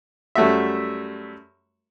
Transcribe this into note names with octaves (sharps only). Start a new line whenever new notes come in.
F#2 G3 A3 F#4 E5